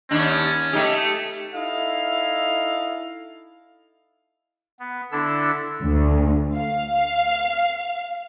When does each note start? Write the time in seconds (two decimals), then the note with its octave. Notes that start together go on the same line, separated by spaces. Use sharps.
0.11 D#2 C#4 D4
0.73 A3 D#4 G4
1.53 D#4 E4 A4 D#5 F5
4.79 B3
5.12 D3 D4 E4 A4 E6
5.82 D2
6.57 F5